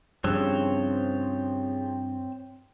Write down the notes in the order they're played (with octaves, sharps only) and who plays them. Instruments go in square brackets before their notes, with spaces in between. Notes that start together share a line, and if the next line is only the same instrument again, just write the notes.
[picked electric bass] G2 [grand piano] C#3 F3 F#6 [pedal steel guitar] C4 C#5 E6